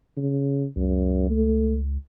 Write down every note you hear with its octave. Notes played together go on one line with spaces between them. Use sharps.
C#3
C#2 F#2
A3